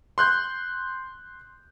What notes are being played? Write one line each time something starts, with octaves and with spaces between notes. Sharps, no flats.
C6 F#6 G6